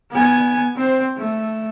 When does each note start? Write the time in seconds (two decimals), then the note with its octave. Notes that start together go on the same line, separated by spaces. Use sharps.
0.11 B3 G#5
0.76 C4 C5
1.17 A3